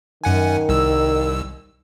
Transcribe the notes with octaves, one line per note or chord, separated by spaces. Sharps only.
F#2 D#3 F#5 G#5
C2 E6